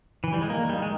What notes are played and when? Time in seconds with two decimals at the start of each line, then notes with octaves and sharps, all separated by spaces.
0.24 E3
0.33 G3
0.41 G#3
0.50 D#3 A#3
0.69 G3
0.82 G#3